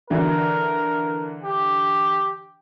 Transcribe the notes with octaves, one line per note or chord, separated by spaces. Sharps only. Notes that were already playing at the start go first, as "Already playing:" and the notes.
D3 E3 A#4
G4